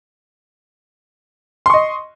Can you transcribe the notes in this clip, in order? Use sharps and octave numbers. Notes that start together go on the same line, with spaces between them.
D#5 C6 C#6